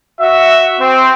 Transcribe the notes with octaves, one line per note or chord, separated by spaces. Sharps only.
F#4 E5
C4